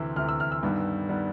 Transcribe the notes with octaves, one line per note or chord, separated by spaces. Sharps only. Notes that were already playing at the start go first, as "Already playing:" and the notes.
Already playing: D2 C3 E3 E6
D2 C3 E3 F6
E6
F6
E6
G2 D#3 G3 B3
D#3 G3 B3